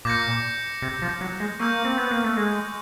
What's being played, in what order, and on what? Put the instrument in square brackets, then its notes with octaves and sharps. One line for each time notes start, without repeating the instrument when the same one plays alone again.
[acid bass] A#2 [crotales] D6 G6 A#6 C#7
[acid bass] C3
F3
F#3
G#3
[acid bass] A#3 [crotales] C#6 E6 G6
[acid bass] C4
B3
A#3
A3
G#3